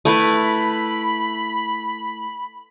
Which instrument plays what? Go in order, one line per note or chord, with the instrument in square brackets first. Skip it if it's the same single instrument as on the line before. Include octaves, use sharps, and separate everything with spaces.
[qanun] A3 E4 B4 [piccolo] B5